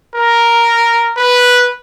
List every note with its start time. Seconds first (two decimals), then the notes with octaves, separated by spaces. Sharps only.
0.16 A#4
1.17 B4